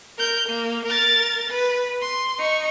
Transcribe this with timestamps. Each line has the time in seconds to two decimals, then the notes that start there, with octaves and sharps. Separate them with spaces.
0.18 A#4 G6
0.49 A#3
0.86 A#4 A6
1.50 B4
2.01 C6
2.39 D#4 C#6